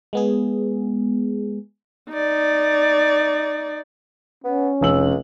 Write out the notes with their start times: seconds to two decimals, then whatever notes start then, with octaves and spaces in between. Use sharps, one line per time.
0.13 G#3 B3 G#4
2.12 D#4 D5
4.45 B3 C#4
4.81 F1 C#2 E6 F#7